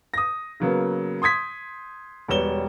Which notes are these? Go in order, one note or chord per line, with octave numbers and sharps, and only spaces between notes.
D#6 A#6
C#3 F#3 A#3 B3
C6 D#6 G#6 B6
E1 G3 B3 C#5 E7 G7